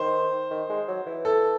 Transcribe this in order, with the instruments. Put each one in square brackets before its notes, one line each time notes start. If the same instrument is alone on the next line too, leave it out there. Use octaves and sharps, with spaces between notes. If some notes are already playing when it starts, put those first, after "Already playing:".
Already playing: [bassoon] D#3 [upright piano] C5
[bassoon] D#3
G#3
F#3
E3
[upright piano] A4